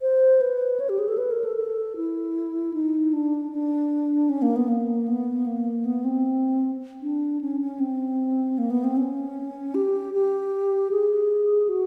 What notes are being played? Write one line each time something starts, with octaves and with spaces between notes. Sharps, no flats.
C5
B4
C#5
G4
G#4
A4
B4
A#4
A4
A4
E4
D#4
D4
D4
C#4
A#3
B3
A#3
B3
A#3
B3
C4
D4
C#4
C#4
C4
A#3
B3
C4
C#4
G4
G4
G#4
F#4